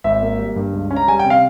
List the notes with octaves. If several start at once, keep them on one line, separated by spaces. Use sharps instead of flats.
G#1 E5
A#3
G3
G2
C#2
C#4
A#5
G3 G#5
C3 G5
F5